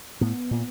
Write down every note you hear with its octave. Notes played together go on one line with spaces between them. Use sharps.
A2 B3
A#2